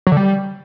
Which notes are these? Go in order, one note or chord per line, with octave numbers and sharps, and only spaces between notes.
F#3
D3
G3